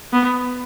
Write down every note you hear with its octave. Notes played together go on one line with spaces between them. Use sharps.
B3